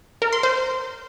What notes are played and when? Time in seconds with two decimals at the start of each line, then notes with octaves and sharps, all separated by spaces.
0.22 A#4
0.33 C6
0.43 C5